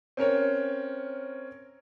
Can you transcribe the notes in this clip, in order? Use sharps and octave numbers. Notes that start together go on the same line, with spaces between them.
C4 C#4 A#4 C#5